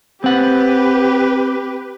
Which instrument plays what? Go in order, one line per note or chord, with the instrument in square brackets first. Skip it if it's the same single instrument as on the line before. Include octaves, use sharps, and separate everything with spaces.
[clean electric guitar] C4 F#5 [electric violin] G4 B4